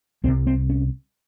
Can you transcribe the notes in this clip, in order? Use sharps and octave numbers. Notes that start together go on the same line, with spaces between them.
C2 C3 C4
C4
C#4